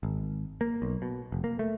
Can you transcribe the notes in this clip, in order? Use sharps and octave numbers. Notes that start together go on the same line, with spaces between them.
G#1
A#3
B1
B2
F1
A#3
A3